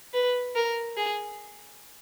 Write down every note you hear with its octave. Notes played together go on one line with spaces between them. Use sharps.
B4
A#4
G#4